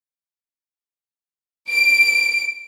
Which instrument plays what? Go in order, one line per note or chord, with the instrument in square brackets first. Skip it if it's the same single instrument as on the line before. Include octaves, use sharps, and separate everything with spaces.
[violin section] D7